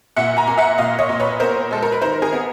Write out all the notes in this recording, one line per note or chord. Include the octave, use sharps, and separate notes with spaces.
A#2 E5 F#5
G#5 A#5
A#3
E5 F#5
A#2 D#5 F5
C#5 D#5
A#2
B4 C#5
B3 A#4 C5
G#3 A4
A#4
B4
D#3 A#4 C5
G#4 A#4
B3